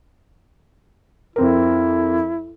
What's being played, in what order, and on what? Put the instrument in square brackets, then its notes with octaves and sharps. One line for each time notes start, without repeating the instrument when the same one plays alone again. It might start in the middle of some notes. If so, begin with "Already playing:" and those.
[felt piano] F2 C4 A#4 [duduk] E4